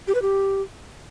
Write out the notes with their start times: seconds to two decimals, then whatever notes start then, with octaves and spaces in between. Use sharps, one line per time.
0.07 G4
0.15 B4
0.22 G4